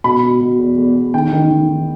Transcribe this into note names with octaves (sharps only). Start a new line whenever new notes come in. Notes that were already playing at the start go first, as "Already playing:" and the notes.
B2 B5
B2
B2
E2
E2
E2
D#3 G5
D#3
D#3
D#3